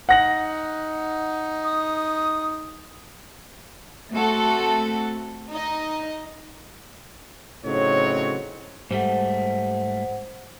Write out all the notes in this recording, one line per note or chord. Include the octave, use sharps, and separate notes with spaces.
D#4 F#5 A#6 F#7
D#6
A3 C4 F#4 A4
D#4 D#5
A2 C#3 F#3 C4 D#4 C#5
G#2 G3 A3 C5 F#5